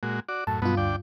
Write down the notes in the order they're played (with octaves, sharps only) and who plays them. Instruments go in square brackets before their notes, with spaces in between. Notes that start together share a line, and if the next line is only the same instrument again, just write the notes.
[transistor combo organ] A#2 G#3 F#4
F#4 D5
[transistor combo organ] F#2 A2 [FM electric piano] A5
[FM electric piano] G2 F4 [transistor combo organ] B2 F#3 B3
[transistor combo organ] D2 D5 G5